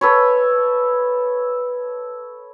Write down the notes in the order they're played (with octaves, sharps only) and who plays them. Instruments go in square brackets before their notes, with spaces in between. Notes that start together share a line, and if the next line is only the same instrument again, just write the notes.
[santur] A4 B4 C#5